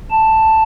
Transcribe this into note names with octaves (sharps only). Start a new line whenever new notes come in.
A5